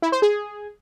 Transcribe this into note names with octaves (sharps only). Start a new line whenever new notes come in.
E4
C5
G#4